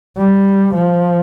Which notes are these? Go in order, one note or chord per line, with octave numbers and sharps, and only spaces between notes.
G3
F3